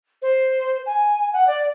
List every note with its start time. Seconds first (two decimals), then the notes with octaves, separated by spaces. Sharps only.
0.22 C5
0.86 G#5
1.33 F#5
1.47 D5